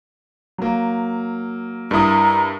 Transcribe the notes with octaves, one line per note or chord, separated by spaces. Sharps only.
F#3 A#3
G2 E4 A#4 A#5 D#6